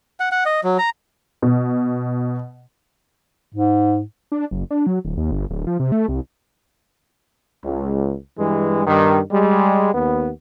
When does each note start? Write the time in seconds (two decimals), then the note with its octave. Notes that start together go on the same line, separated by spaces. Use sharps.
0.20 F#5
0.32 F#5
0.46 D#5
0.64 F#3
0.79 A#5
1.42 B2
3.55 G#2
4.32 D4
4.51 F#1
4.71 D4
4.87 F#3
5.05 D1
5.17 D#2
5.31 G1
5.50 D1
5.67 F3
5.80 C3
5.92 A3
6.08 C2
7.64 C#2
8.39 G2 E3 G#3
8.86 G2 D#3
9.32 G3 G#3
9.94 D#2 B3